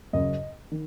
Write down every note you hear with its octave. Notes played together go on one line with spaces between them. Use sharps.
F#2 C#3 D#5
D#3